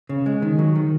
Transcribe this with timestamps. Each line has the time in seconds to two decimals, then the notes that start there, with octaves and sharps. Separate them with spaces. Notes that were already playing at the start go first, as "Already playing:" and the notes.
0.09 C#3
0.26 G#3
0.42 D#3
0.59 F#3
0.75 D#3